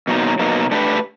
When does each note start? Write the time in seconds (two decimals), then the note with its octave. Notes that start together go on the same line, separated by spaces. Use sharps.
0.07 B2 F#3 A#3 D#4
0.39 B2 F#3 A#3 D#4
0.71 A3 D4 G4 B4